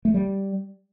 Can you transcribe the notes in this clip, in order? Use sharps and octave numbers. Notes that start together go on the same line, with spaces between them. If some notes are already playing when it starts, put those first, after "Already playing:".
A3
G3